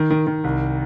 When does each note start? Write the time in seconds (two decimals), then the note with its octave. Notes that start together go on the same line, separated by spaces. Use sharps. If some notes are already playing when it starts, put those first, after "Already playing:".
Already playing: D#3
0.10 D#3
0.27 D#3
0.44 C2